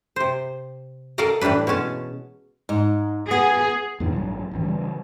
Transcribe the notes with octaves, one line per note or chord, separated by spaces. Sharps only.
C3 C5
A4 A#4 D5 D#5 F5 A#5
A2 E3 G3 D4 B4
B2 G#3 C#4 A5
G#2
B3 G#4
E2 G#2 B2 D#3
A1 G2 F#3
D#1 G#1 E3
C#3 E3 G3